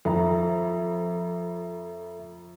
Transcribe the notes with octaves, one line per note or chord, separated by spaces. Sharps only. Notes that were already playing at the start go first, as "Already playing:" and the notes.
F2 A4 E5 A#5